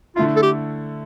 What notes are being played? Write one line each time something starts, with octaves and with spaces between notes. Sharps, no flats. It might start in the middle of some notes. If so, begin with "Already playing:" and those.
D3 A3 E4 F4
A4
G4